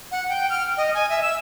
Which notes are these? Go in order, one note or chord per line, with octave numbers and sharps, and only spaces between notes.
F#5
G5
F6
D#5
G#5
E5
E6